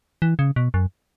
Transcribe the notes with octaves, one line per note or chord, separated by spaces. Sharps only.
E3
C#3
B2
F#2